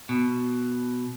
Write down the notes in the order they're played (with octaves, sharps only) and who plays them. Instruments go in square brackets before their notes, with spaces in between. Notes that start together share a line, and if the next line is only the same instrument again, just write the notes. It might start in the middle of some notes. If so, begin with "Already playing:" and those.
[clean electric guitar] B2